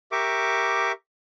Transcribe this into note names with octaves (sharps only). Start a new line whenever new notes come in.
G4 A#4 E5 C#6 D6